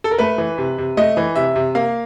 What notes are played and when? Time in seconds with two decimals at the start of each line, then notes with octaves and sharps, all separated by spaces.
0.04 A4
0.11 A#4
0.19 A3 B4
0.38 E3
0.58 C3
0.78 C3
0.97 A3 D#5
1.17 E3
1.36 C3 E5
1.56 C3
1.75 A#3 F5